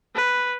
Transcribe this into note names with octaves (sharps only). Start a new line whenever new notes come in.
B4